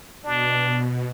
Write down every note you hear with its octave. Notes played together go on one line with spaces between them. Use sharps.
B2 D4